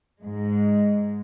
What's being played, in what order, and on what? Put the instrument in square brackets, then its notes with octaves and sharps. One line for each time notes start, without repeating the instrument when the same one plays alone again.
[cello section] G#2 G#3